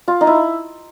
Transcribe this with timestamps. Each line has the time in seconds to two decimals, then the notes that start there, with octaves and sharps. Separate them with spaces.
0.08 F4
0.21 D#4
0.27 E4